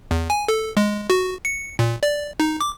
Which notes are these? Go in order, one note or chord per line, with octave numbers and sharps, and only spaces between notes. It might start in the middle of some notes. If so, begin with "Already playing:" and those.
E2
G#5
A4
G#3
F#4
C#7
A#2
D5
D#4
D6